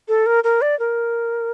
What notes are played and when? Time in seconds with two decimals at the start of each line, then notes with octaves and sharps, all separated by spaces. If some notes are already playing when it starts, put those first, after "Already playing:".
0.08 A4
0.26 A#4
0.44 A#4
0.61 D5
0.79 A#4